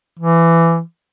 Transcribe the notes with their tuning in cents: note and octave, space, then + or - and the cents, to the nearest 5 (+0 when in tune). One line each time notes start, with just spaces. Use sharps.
E3 +20